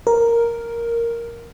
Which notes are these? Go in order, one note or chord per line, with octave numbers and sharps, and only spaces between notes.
A#4